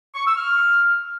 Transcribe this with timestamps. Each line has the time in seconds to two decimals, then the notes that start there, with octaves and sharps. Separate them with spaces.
0.15 C#6
0.25 E6
0.36 F6